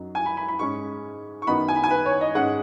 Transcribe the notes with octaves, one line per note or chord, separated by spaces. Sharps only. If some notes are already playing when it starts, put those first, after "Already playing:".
Already playing: F#2 F#3 D#4
G#5
B5
B5
B5
G#2 G#3 C#4 C#6
C#6
F#2 D#3 B3 D#4 B5
G#5
B5
G#5
B4
C#5
D#5
G#2 G#3 C#4 F#5